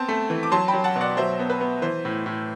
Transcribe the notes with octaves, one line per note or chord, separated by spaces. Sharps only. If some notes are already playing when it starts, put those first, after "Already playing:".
Already playing: B3 C4 A5
A3
E3
D6
F#3 A5 C6
G5 B5
F#3
F#5 A5
B2
D5 F#5
F#3 C5 E5
B3
B4
B3
E3 C5
A2
A2